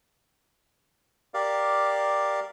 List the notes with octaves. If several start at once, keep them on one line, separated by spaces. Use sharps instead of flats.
G4 A#4 D5 F5